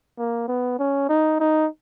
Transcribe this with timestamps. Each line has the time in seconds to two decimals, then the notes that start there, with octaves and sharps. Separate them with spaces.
0.18 A#3
0.48 B3
0.79 C#4
1.09 D#4
1.40 D#4